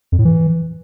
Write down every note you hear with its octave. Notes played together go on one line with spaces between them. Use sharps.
F2
A2
E3